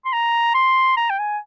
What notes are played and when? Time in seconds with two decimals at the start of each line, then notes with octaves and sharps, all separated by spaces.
0.05 C6
0.13 A#5
0.55 C6
0.97 A#5
1.10 G5
1.19 G#5